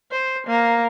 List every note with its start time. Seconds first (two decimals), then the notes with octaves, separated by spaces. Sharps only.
0.12 C5
0.47 A#3